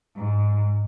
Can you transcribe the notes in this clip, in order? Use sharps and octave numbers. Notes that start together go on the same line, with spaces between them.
G#2